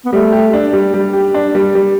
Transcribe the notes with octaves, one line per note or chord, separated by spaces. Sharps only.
B3
G3 A3
G4
D4
G3
G3
G4
D4
G3
G3